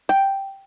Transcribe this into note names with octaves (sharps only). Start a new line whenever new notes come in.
G5